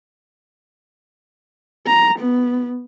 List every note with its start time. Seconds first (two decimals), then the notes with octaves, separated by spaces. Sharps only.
1.87 A#5
2.19 B3